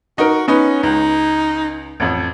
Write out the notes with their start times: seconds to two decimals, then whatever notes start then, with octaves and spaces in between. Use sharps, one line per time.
0.18 D#4 F#4 A#4
0.48 B3 C#4 D#4 B4
0.83 C#2 D#4
2.00 A1 F2